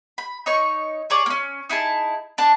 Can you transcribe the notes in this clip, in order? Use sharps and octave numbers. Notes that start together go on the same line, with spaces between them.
B5
D#4 C#5 C#6
G#4 C#5 D5
A#3 C#4
D#4 E4 G#4 A5
D4 A5